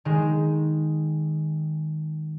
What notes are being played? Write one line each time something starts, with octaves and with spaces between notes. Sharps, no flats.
D#3 G#3